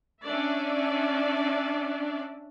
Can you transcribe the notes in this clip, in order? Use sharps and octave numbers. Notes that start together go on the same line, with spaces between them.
C#4 D4 D5 E5